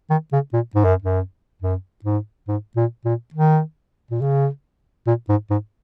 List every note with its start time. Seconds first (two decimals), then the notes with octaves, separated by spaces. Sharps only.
0.10 D#3
0.32 C#3
0.53 A#2
0.75 G#2
0.85 F#2
1.02 F#2
1.62 F#2
2.04 G#2
2.48 G#2
2.76 A#2
3.05 A#2
3.34 D#3
4.11 A#2
4.21 C#3
5.07 A#2
5.29 G#2
5.50 G#2